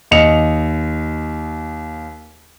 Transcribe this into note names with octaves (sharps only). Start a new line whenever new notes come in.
D#2 D#5 C#7 F7